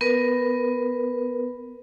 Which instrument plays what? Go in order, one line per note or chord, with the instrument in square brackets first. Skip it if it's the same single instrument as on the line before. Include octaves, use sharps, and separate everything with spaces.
[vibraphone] B3 A#4 B4